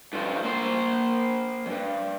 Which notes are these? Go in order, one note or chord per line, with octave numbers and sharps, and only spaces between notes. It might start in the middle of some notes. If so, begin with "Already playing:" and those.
G2 F3
A#3 C5
E2 G2